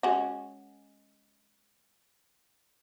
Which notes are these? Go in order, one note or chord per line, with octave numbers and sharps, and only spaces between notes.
G#3 C#4 F#4